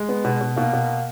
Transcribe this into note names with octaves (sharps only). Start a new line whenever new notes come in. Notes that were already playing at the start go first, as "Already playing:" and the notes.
Already playing: G#3
B3
B2
B2
B2 A#3
B2